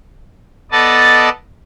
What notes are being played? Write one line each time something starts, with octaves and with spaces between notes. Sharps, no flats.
B3 A4 D5 D#5 A5